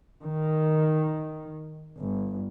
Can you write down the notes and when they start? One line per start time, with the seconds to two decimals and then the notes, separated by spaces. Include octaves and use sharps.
0.23 D#3
1.98 G1